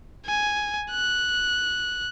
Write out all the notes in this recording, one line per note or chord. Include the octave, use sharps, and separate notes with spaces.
G#5
F#6